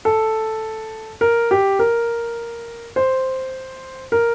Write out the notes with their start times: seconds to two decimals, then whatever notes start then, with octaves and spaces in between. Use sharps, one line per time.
0.05 A4
1.21 A#4
1.51 G4
1.79 A#4
2.96 C5
4.12 A#4